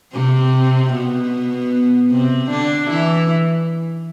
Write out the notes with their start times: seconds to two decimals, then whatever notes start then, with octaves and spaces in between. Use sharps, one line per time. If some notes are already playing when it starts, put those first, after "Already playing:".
0.13 C3 C4
0.93 B2 B3
2.11 C3 C4
2.50 D3 D4
2.89 E3 E4